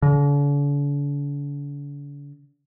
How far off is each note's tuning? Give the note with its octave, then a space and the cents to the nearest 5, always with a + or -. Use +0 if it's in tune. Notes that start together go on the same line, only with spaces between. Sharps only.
D3 -45